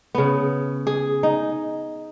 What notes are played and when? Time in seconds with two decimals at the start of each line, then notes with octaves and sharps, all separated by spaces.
0.15 C#3 B3
0.87 G#4
1.23 D#4